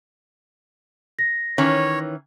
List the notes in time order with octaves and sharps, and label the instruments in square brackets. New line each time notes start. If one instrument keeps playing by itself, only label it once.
[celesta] A#6
[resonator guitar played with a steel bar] D#3 E3 C#4 [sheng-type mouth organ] C#5